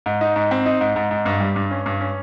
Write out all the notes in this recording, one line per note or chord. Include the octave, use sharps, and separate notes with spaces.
G#2
D#4
G#2
C4
D#4
G#2
G#2
G#2
G2
G3
G2
C#4
G2
C#4